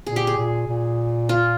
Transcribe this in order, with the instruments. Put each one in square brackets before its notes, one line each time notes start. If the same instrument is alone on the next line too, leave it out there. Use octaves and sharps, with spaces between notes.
[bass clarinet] A#2 [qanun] G#4
[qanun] G4
G#4
[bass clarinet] A#2
A#2
[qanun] F4